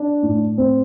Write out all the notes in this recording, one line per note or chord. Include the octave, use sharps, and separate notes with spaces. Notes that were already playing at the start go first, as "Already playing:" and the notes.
Already playing: D4
A2
C4